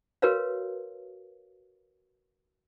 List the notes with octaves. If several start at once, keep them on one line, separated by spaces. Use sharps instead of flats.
F#4 A#4 B4 C#5 F5